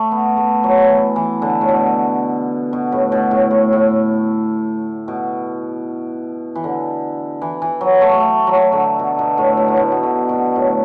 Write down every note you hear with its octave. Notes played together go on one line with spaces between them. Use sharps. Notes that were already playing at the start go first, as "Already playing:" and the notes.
Already playing: A3
B3
A3
F#3
E3
E3
D3
A2
B2
B2
A2
B2
A2
A2
A2
B2
E3
D3
E3
E3
F#3
A3
A3
F#3
D3
B2
B2
A2
B2
A2
B2
B2
D3
B2
A2